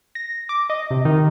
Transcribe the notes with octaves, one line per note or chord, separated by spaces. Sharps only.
A#6
D6
D#5
C3
D#3